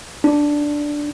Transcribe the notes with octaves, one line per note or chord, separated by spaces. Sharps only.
D4